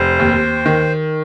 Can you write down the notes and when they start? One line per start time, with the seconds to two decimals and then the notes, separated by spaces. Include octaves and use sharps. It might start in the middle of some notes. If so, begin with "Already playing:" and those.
Already playing: F1 C5
0.20 D#2
0.66 D#3